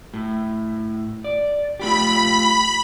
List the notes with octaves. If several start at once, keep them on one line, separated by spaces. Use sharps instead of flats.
A2
D5
A3 F4 G4 B5